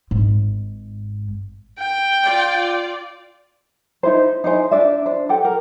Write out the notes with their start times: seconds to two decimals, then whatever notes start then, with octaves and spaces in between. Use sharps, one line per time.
0.11 G#1 G#2
1.79 G5
2.23 F4 D5
4.03 D#4 E4 C5
4.44 D#4 E4 C5 G#5
4.71 D4 D5 E5
5.06 D4 C5
5.29 G4 A4 F#5 G5
5.45 A#4